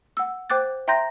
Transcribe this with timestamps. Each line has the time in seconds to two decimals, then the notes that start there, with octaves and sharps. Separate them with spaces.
0.17 F#5 E6
0.50 C5 G5 D6 F#6 A6
0.88 E5 G5 A#5 C6 G6 A#6